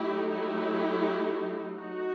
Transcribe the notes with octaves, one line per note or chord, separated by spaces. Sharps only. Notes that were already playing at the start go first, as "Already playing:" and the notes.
Already playing: F#3 A3 D#4 E4 G4
E4 G4
D#4 F#4